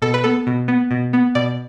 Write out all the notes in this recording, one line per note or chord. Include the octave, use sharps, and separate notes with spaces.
B2 A4
B4
B3 A4
B2
B3
B2
B3
B2 D5